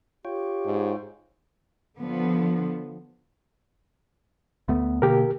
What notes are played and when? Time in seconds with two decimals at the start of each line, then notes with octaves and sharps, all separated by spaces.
0.25 F4 G4 C#5 G5
0.65 G#2
1.99 D3 F3 B3
4.68 D2 A3 B3
5.02 B2 D3 A#3 G4 A#4